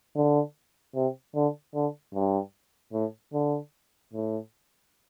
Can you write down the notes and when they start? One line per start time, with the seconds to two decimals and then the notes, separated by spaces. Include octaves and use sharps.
0.16 D3
0.95 C3
1.35 D3
1.75 D3
2.15 G2
2.93 A2
3.33 D3
4.14 A2